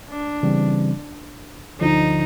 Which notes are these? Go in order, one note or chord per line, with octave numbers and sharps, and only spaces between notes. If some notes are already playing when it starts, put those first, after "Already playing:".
D4
C#3 E3 G3 C4
D2 D3 F3 D#4